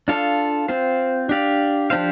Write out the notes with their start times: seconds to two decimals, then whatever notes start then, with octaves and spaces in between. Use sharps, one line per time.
0.08 D4 F4 A4 F5
0.68 C4 F4 C5
1.29 D4 G4 D5 F5
1.90 F3 D4 G4 C5 F5